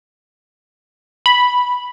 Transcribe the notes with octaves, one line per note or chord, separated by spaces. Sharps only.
B5